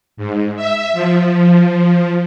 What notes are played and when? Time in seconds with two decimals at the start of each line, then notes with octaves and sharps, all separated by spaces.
0.17 G#2
0.57 E5
0.93 F3